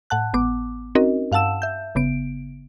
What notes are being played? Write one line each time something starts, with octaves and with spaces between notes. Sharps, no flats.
A2 F#5 A5 F#6
G#1 B3 D6
C4 C#4 D#4 F#4 A#4 D#5
G2 F5 F#5 A5 E6 E7
E5 G6
G1 C#3 B3 D7